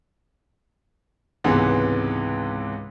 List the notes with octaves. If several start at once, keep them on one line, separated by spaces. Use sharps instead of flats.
C#2 G#2 C3 E3 B3